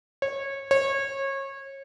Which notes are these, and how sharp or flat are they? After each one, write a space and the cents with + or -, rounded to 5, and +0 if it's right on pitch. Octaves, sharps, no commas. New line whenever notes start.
C#5 -20
C#5 -25